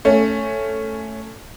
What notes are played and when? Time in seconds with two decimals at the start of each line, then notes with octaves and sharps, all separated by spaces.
0.05 A3 C#4